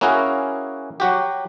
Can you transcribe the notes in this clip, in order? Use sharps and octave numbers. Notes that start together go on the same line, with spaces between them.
A#3 C#4 E4 F#4 G#4 A#4
F#3 F#4 G4